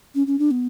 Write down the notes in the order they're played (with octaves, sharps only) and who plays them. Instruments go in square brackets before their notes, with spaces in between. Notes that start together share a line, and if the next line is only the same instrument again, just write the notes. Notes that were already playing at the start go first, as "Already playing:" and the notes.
[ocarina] C#4
C#4
D4
B3